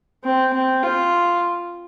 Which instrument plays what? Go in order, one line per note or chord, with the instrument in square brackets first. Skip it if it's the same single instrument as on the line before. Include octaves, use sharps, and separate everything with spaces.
[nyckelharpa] C4
C4
F4